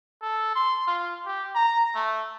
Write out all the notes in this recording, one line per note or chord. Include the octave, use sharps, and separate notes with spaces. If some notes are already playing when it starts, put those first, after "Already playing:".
A4
C6
F4
G4
A#5
A3